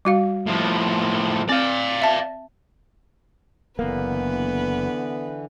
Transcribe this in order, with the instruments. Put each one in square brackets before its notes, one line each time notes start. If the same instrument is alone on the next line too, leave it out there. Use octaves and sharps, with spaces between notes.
[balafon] G3 F#4 F5
[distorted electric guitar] A2 F3
[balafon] C4 [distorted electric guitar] D5 F5
[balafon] E5 A5
[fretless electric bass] F#1 A#3 [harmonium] D3 E3 [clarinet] B3 [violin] B4